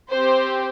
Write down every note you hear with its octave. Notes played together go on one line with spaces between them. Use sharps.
C4 G4 C5